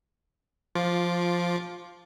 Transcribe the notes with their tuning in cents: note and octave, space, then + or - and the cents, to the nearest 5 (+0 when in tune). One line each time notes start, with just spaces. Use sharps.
F3 +0 F4 +15 D6 +0